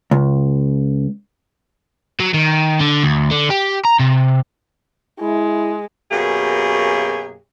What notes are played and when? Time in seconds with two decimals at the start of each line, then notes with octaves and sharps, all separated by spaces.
0.11 C#2
2.20 F#3
2.34 D#3
2.80 D3
3.04 D2
3.31 D3
3.50 G4
3.85 A#5
3.99 C3
5.20 G#3 E4
6.11 F#2 B2 A#3 G4 G#4